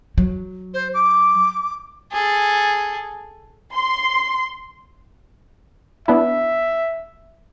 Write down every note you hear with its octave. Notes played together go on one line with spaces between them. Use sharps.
F#3
C5
D6
G#4 A4
C6
B3 D4 E4 E5